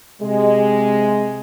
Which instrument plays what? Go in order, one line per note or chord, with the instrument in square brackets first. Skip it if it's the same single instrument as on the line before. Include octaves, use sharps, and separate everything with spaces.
[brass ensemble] C3 G#3